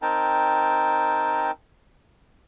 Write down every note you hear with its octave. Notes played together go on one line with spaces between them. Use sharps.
C4 D#4 A#4 G5 A5